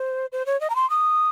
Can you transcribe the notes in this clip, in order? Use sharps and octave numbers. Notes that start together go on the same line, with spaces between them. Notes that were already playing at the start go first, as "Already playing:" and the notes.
Already playing: C5
C5
C#5
D#5
A#5
C6
D#6